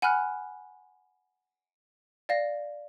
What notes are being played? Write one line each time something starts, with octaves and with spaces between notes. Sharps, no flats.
F#5 G#5 B5 F6 F#6
D5 F5 A#6